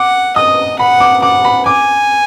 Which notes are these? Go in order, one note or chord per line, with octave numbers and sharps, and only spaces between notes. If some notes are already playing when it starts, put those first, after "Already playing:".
Already playing: F#5 D6
D#5 D#6
F#5 B5
D6
F#5 D6
B5
G#5 D6